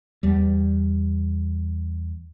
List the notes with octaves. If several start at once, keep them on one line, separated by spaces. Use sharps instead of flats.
E2 G3